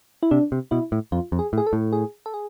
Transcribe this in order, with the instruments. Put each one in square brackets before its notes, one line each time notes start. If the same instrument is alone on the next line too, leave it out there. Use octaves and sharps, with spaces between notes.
[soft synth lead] E4
[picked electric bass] C3 [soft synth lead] D4
[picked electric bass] C3
[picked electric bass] B2 [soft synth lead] E4
[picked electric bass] A2
[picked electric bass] F2 [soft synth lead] F4
[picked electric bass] F2
[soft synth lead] G#4
[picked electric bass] A2
[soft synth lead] G#4
A4
[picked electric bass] A2
[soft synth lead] G#4
A4
G#4